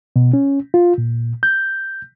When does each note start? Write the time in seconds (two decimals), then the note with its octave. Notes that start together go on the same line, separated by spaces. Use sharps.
0.16 B2
0.33 C#4
0.74 F4
0.98 A#2
1.43 G6